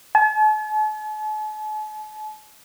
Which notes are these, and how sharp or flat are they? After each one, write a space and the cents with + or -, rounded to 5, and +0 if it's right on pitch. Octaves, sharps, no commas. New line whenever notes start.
A5 -45